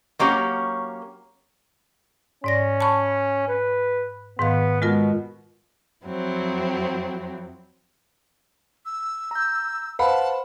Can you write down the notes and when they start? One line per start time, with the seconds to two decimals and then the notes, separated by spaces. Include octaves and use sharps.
0.19 F#3 A#3 C#4 G4 C#5
2.44 G#2 C#4 D5 A#6
2.81 A5 B5 C#6
3.48 B4
4.39 G#2 D#3 B3 F5
4.82 B2 G#3 F4 A#4
6.05 F2 F3 F#3 C4 E4
8.86 E6
9.31 A#5 G6
9.99 B4 C5 F5 F#5 A5 B5